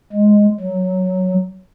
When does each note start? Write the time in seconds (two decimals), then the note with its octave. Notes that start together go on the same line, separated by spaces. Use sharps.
0.13 G#3
0.61 F#3